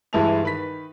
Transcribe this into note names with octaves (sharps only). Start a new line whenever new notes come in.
G2 E3 G#3 E4 A5 F7
D#3 B4 B6